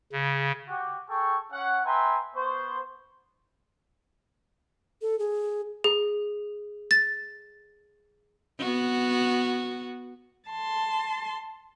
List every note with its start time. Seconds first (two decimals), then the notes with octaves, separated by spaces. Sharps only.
0.12 C#3
0.69 F#4 G4
1.09 G#4 A4 G5 C#6
1.51 C#4 F#5
1.84 B4 E5 G5 G#5 A#5 C6
2.35 B3 C5 C#6
5.02 A4
5.19 G#4
5.84 G#4
6.91 A6
8.59 B3 F#4
10.49 A5 C6